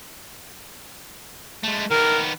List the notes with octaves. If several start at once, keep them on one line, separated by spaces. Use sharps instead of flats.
G#3 A3
D#3 B3 A#4